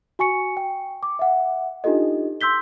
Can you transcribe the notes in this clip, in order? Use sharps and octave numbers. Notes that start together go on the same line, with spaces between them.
F#4 G#5 C#6 C#7
G5
D6
E5 F#5
D4 D#4 F4 G4 A4 D#5
C6 E6 G6 B6 G7